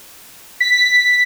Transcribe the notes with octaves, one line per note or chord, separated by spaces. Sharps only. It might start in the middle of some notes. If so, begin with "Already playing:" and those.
B6